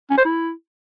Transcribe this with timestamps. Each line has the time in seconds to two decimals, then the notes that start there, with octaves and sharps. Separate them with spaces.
0.11 C#4
0.18 C5
0.25 E4